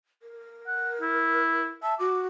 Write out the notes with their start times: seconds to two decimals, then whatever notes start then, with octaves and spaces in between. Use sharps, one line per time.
0.22 A#4
0.67 F#5
1.01 E4
1.83 E5 A5
1.99 F#4 D6